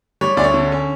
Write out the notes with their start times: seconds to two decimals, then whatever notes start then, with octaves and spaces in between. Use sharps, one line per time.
0.21 G3 C#5
0.37 D2 D5
0.44 C#5
0.54 D3
0.72 C#4